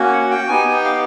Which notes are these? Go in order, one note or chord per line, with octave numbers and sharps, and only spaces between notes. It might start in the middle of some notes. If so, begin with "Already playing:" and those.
Already playing: A#3 C#4 F#4
F#5
G5
B3 D#4 G4 G#5
G5
F5